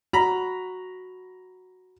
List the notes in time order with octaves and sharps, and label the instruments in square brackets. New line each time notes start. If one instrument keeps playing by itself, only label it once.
[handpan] F#4 [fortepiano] A#5 B5